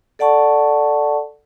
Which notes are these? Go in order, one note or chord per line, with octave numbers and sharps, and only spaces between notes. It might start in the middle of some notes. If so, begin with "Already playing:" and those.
A4 D5 F#5 A5 C#6